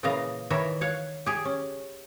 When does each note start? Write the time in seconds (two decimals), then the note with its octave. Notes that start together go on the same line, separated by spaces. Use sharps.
0.03 A#2 C#3 E3 D#5 F5 A#5
0.50 D#3 E3 A#4 C#5 E5
0.81 C#5 F5 F#5
1.26 G4 G#4
1.45 C#4